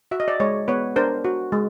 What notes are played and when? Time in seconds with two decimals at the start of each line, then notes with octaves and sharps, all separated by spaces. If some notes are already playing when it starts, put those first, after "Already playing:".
0.11 F#4 E5
0.20 D#5
0.28 D5 E5
0.40 G#3 C#5 D#5
0.68 B3 B4 C#5
0.96 D4 A#4 C5
1.25 F#4
1.52 G#3